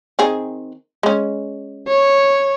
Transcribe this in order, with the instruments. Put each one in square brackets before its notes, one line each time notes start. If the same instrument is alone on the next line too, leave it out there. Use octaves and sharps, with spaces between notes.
[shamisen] D#3 C4 G#4
G#3 C#4
[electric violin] C#5